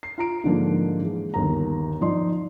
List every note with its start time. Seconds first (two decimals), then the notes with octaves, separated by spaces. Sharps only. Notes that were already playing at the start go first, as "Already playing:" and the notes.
0.03 C7
0.18 F4 A#5 D7
0.44 G#2 D3 F3 A#3
1.01 E3 G#3
1.34 G1 D#2 A#5
2.01 F3 D#4 D5 C6